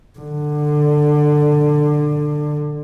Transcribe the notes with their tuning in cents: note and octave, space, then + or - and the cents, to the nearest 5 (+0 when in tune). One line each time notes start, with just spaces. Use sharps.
D3 +15